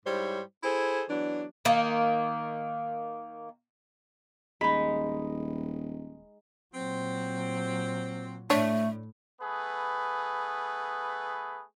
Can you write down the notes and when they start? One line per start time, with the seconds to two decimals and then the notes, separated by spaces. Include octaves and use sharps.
0.06 G#2 G3 E4 C5 C#5
0.64 E4 G#4 A4 C5
1.09 E3 F#3 B3 D4
1.65 D#3 A#3
4.61 D#1 G#3 D#4 B5
6.74 A#2 F#3 C4
8.50 A2 A3 D4 C#5
9.41 A3 B3 G#4 B4